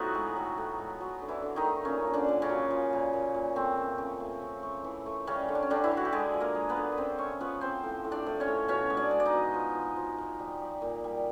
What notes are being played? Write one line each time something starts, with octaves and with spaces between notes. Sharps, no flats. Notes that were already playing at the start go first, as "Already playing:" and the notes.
Already playing: A2 F3 F#3 B3 D#4 F#4 B4
G#3
A2
A2
G#3
F#3
D3
E3 E4
D3
D#3 D#4
A3
A#2 C#3 C#4
A#2
D3 D4
A#2
C#3 C#4
F#3
F3
A#2
A#2
A#2
A3 C4
C#3
C#3
A3
C#3
A3
E3
A3
C#3 G3 C#4
D3
D4
C#4
D3 G3 D4
E3 E4
D3
F#4
G4
D3 G#3 G#4
F3
A#3 A#4
G#3
B3 B4
D3
B4
C#3 C4 C5
A3 C#4 C#5
F3 B3 B4
C#3 C4 C5
A2
A2
D4 D5
A2
C#4 C#5
A2
B2 C#4 C#5
G#3
D4 D5
G#3
D5
D#4 D#5
B2
F3
F3
F3
F3
G3
G3
A#2
G3